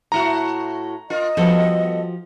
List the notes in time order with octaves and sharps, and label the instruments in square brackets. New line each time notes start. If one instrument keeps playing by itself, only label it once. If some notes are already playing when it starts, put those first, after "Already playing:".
[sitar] A2 E4 F#4 [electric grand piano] A#5
[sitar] F4 A#4 [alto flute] D#5
[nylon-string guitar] F3 F#4 G4 [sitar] G3 B3 A4